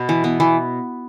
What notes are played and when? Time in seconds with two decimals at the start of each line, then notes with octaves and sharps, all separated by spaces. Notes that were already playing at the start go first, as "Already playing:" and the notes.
Already playing: B2
0.09 E3
0.24 B3
0.40 E3